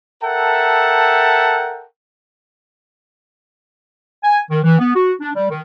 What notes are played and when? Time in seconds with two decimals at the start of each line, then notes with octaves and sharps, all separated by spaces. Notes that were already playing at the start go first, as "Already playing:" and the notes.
0.23 A4 A#4 E5 F#5 G5 A5
4.23 G#5
4.50 D#3
4.64 E3
4.79 B3
4.95 F#4
5.20 D4
5.34 G3
5.51 D#3